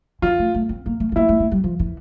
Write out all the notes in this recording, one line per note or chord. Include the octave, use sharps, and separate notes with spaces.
E3 F4
A3
A3
C4
A#3
A3
A3
A#3 E4
A3
A3
G3
F3
E3